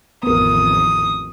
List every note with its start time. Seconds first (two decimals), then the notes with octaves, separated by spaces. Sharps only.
0.23 A1 F2 D#3 B3 A#4 D#6